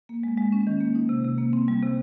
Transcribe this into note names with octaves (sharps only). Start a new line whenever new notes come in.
A#3
G#3
G#3
C#4
D#3
A#3
D#4
C3
C3
A#3
C4
G3
C3